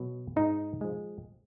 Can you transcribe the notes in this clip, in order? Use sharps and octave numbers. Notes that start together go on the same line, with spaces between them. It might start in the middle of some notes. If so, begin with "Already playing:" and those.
Already playing: B2 F#3
G#2 D#4
F3 G#3